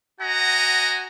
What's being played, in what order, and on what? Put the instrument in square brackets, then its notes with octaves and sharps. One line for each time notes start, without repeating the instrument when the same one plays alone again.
[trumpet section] F#4 D#5 F#5 G#5 A#5